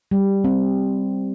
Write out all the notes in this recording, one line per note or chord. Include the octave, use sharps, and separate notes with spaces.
G3
C4